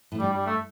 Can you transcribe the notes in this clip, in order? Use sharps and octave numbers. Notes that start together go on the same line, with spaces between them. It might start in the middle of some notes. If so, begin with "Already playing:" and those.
A2
G2 G3
G3
A3